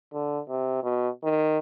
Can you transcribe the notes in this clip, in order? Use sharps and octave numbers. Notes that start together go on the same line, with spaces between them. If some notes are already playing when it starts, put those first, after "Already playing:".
D3
C3
B2
D#3